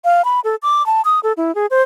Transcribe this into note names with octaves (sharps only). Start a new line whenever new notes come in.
F5
B5
A4
D6
A5
D#6
A4
E4
G#4
C5